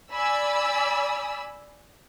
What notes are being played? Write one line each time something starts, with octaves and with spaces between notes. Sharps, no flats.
D5 G#5 B5 E6